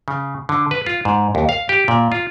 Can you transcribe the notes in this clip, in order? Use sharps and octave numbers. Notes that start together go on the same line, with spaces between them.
C#3
D3
B4
F4
G#2
D#2
F5
G4
A#2
F4